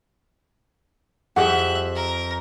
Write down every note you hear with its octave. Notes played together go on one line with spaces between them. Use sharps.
F2 G4 G#4 E5 F#5 F#6
A#4